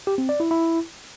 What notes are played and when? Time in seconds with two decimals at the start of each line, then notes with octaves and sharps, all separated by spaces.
0.07 G4
0.18 C4
0.29 D5
0.40 E4
0.51 E4